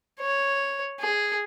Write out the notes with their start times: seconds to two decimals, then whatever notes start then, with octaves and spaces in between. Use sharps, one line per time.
0.20 C#5
1.00 G#4